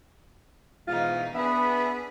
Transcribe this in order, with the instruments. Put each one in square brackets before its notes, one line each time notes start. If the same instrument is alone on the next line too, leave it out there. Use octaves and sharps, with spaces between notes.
[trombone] G#2 [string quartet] B2 E3 D#4 [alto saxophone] F4
[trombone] B3 [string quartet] D4 G#4 B4 [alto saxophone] E5